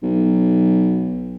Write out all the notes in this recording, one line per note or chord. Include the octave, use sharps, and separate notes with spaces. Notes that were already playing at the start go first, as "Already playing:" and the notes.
B1